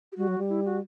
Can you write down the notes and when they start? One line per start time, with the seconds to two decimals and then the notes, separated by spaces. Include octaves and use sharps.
0.12 G4
0.17 G3 F#4
0.28 F#3
0.38 G3
0.49 E4
0.65 F#4